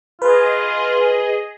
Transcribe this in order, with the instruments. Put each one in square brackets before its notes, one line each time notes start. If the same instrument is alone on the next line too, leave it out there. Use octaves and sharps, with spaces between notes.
[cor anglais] F4 [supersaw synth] G#4 D#5 [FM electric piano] B4